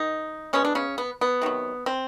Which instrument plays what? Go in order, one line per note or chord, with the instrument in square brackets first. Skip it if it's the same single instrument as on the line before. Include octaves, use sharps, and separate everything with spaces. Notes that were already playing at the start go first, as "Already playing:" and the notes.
Already playing: [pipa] D#3 D#4
B2 G#3 B3 C#4
D4
C#3 C#4
B3
B3
C3 D#3 F#3
C4